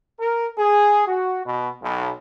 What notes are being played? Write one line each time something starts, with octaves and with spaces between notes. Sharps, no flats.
A#4
G#4
F#4
B2
B1